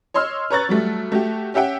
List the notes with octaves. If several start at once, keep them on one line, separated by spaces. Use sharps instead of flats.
C#5 D#5 C6 E6 F6
B4 C#5 A#5 C#6 F#6 A6
F#3 G3 A3
A3 F#4 G4
C#4 G4 E5 F#5 G5